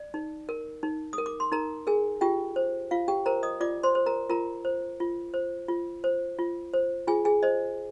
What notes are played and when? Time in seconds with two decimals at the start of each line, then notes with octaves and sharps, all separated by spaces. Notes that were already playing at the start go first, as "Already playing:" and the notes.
Already playing: D5
0.14 D#4
0.49 A#4
0.83 D#4
1.13 D#6
1.18 A#4
1.26 D6
1.40 C6
1.52 D#4 A#4 A#5
1.87 G#4 A#4 G#5
2.21 F4 G4 G5
2.56 C5
2.91 F4 F5
3.08 G4 G5
3.26 A#4 C5 A#5
3.43 D#5 D#6
3.60 F4 D5 D6
3.83 C5 C6
3.95 C5
4.06 A#4 A#5
4.29 F4 A#4 A#5
4.65 C5
5.00 F4
5.34 C5
5.68 F4
6.04 C5
6.39 F4
6.74 C5
7.07 F4 G#4 G#5
7.25 G#4 G#5
7.43 C5 D#5